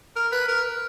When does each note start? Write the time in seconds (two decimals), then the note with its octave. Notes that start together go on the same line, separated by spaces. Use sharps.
0.16 A#4
0.32 B4
0.48 A#4